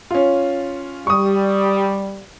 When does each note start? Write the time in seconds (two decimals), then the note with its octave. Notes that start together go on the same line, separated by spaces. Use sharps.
0.11 C#4 F4
1.07 G3 C#6 D#6